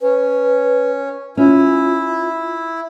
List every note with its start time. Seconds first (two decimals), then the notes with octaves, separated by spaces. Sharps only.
0.01 C#4 B4
1.37 C#4 E4 F4